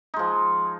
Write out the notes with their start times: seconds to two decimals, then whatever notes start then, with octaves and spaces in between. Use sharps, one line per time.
0.14 D#4
0.16 G#3
0.19 F3